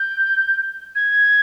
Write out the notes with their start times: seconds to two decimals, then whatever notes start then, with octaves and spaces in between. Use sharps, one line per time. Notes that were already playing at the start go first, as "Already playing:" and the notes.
Already playing: G6
0.95 G#6